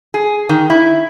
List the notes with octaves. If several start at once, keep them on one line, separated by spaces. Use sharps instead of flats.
G#4
D#3
E4